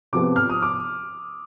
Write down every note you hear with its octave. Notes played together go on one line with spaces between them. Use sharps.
C3 F3 B3 D6
F6
D#6
D6